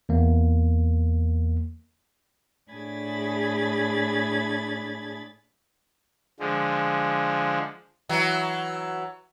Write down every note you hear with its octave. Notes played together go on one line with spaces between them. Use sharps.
E2 A#3
A2 D4 G#4 B5 G#6 A6
D3 F3 G#3
E3 F#3